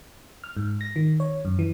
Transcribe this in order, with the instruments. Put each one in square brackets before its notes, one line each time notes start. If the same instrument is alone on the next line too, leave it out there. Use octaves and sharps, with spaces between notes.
[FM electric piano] F6
G#2
A#6
D#3
C#5
F#2
E3